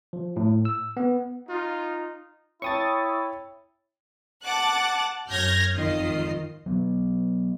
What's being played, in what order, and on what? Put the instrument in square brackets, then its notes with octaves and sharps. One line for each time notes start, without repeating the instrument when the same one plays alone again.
[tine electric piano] F3
A2
E6
B3
[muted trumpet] D#4 [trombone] F4
[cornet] E4 [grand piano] C#5 G5 A5 [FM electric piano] C#6 D#6 A6
[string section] F#5 A5 D6 F#6 A6
F#2 C#5 F6 G6 G#6 A#6
G#1 F2 D#3 F4 D#5 C7
[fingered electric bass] F#3 B3